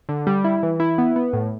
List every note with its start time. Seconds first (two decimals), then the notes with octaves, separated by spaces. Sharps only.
0.09 D3
0.27 G3
0.44 E4
0.63 E3
0.80 E4
0.98 B3
1.16 B3
1.33 A2